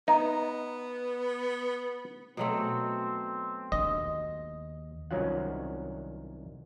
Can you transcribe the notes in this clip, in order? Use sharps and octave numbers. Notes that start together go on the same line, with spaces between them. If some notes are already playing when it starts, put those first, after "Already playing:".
B3 D#4
B2 F#3 A3 C4
D#2 D4 D#5
C2 D#3 F#3 C#4 F4 F#5